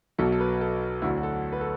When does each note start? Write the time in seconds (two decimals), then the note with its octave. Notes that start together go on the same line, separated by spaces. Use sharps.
0.18 B1 B2 F#3 A4
0.32 A4
0.40 B4
0.61 A4
1.02 D2 D3 F#3 E4
1.17 F#4
1.23 A4
1.53 B4
1.61 A4